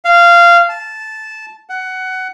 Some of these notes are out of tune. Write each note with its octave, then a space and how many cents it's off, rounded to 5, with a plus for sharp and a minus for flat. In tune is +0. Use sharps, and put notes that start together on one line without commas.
F5 -15
A5 -10
F#5 +15